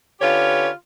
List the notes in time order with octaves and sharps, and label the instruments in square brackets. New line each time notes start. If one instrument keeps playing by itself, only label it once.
[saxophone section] D3 C#4 F4 G4 B4 C#5